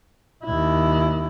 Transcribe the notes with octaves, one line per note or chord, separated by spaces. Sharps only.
D#2 E4